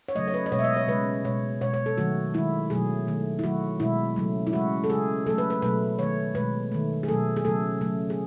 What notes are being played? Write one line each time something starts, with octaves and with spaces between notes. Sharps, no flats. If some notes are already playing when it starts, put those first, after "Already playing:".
C#5
C#3 F#3 A3 D#5
C#5
B4
D#5
B2 G#3 C#5
E5
D#5
C#5
C#3 G#3 B4
B2 G#3 C#5
B2 G#3 C#5
C#5
A4
D#3 F#3 A3 F#4
D#3 G#3 E4
B2 F#3 A3 G#4
D#3 A3
E4
D#3 F#3 A3 F#4
B2 G#3 E4
C#3 F#3 A3
E4
C#3 G#3 F#4
A4
C#3 G#3 G#4
C#3 F#3 A3 A4
B4
B4
B2 F#3 A3 B4
D#3 A3 C#5
B2 G#3 B4
D#3 A3
G#4
B2 F#3 A3 A4
G#4
C#3 F#3 A3 A4
C#3 F#3 A3
G#4